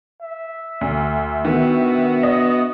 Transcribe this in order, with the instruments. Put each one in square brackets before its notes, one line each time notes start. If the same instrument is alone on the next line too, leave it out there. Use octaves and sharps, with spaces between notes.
[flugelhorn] E5
[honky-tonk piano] D2
[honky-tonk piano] D#3 [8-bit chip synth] B3 F#4 [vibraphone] D4 F#5
[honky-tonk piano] D#5